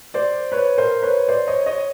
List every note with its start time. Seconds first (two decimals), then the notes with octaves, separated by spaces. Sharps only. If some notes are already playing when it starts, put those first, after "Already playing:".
0.14 C5 D5
0.52 B4 C#5
0.78 A#4 C5
1.02 B4 C#5
1.28 C5 D5
1.47 C#5 D#5
1.66 C#5 D#5